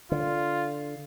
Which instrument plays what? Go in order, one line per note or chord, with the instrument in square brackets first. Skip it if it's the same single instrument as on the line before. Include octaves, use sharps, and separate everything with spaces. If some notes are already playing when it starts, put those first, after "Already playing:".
[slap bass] D3 [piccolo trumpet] F4